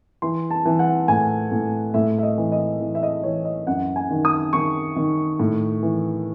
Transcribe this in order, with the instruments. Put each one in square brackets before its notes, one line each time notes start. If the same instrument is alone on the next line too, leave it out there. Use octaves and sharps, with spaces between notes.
[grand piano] E3 C6
A5
E3
F#5
A2 G#5
A2
A2 E5
E5
D#5
E3
D#5
E3
E5
D#5
E3 C#5
D#5
F#2 F#5
G#5
D#3
D#6
D#3 C#6
D#3
A2
E3